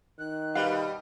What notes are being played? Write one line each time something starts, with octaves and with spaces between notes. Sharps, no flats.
D#3 F#6
B2 G3 G4 B4 F5